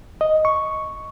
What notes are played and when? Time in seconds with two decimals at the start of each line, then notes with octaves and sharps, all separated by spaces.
0.21 D#5
0.45 C#6